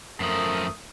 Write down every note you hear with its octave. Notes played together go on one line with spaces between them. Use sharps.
F#2 F3 A3 A#4 D#6